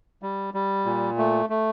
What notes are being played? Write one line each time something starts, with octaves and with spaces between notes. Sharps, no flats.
G3
G3
A#2
A3
A3